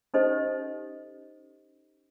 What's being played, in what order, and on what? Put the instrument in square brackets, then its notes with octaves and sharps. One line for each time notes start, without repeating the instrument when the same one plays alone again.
[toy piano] C#4 D#4 G4 A4 C5 D#5